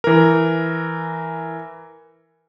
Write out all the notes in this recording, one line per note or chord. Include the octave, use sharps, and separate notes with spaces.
E3 A#4